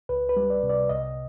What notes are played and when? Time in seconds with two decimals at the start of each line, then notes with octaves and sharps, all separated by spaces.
0.09 C#2 B4
0.29 B4
0.36 G3
0.50 D5
0.63 C3
0.69 D5
0.89 C2 D#5